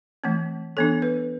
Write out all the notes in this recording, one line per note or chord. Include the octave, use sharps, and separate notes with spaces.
E3 A3 C4
E3 B3 D4 A4
B4